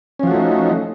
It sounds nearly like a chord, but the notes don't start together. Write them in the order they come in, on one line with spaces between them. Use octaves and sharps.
C#4 F3 F#4 A3 D#4